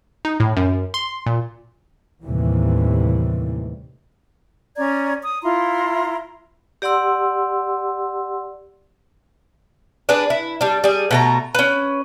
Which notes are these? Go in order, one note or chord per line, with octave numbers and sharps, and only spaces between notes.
D#4
A2
F#2
C6
A#2
D#2 A2 C3 E3 G3
C#4 D5 A#5 G#6
D#6
E4 F4 A#5 C6
G4 D5 F#5 C6 E6
D4 G#4 B4 D5
E4
G3 D4
G3 G#4
B2 A3 A#5
C#4 B4